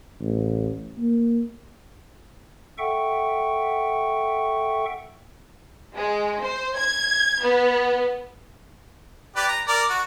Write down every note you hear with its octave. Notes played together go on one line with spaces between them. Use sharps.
A1
A#3
A4 E5 F#5 G5 C#6
G#3
C5
G#6
B3
G4 B4 D5
A#5
A#4 D5
F#4